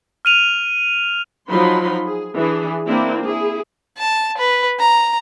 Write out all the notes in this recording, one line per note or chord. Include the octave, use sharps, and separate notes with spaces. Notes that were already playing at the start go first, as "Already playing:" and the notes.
F6 D#7 F7
F3 F#3 D#4 B5 C6
G#4
E3 D4 G#4
A#3 C4 D4 E4
E4 G#4
A5
B4
A#5